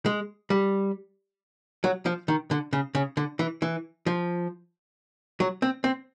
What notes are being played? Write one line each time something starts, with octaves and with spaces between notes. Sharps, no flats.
G#3
G3
F#3
F3
D#3
D3
C#3
C#3
D3
E3
E3
F3
F#3
C4
C4